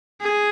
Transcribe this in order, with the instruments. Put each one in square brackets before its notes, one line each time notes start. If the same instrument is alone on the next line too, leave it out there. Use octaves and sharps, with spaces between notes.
[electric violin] G#4